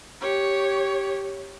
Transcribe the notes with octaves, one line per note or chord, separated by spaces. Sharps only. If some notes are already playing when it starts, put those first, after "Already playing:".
G4 C#5